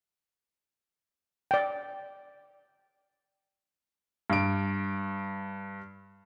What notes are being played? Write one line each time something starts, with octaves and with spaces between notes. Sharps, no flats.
D5 G5
G2 D7